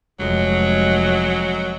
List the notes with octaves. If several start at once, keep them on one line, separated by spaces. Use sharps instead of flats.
F1 F#3 G#3